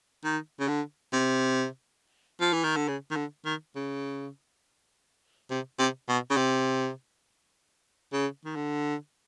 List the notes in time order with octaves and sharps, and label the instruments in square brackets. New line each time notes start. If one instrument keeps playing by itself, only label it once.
[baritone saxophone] D#3
C#3
D3
C3
F3
E3
D#3
D3
C#3
D#3
D3
D#3
C#3
C3
C3
B2
C#3
C3
C#3
D#3
D3